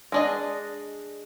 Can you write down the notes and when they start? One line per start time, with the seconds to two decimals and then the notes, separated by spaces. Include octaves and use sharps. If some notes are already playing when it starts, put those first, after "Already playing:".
0.12 G#3 D4 D#5